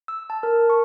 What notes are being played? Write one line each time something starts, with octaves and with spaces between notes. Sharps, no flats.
E6
A5
A#4
C#6